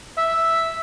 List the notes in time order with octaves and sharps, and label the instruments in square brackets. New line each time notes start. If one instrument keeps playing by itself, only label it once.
[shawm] E5